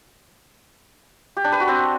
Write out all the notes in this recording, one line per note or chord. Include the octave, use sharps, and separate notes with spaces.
G4
D4
B4
F#4
C4